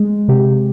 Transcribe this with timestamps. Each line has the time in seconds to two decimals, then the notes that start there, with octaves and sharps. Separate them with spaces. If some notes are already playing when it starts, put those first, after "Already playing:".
Already playing: G#3
0.28 C3 G4